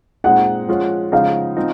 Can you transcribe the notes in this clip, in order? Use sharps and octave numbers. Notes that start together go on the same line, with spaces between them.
A#2 G#3 C4 D#4 F#5
F3 G#3 C#4 F4
C#3 F3 G#3 D#4 F5
F3 C4 D#4